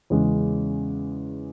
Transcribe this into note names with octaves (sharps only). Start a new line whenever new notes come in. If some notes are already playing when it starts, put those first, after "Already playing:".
E2 C#3 G#3 C#4